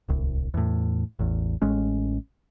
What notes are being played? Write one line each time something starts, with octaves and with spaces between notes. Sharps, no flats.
D1 C2
E2 A2
A1 E2
A1 G#3 C#4